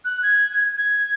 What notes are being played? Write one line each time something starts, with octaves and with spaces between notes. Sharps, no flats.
F#6
G#6
G#6